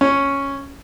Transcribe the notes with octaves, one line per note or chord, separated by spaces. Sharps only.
C#4